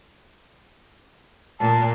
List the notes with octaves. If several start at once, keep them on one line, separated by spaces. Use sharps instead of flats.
A#2 A5